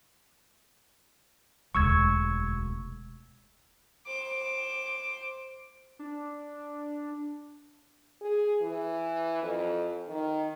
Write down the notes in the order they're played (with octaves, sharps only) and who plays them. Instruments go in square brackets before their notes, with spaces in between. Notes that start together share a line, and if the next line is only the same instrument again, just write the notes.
[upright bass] E1 D2 [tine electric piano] C#6 E6 G#6
[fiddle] C5 D6
[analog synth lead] D4
[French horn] G#4
E3
F2
D#3